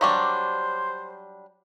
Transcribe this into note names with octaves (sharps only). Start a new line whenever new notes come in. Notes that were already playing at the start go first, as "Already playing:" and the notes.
F#3 G3 D4 C5 F5 C#6 D6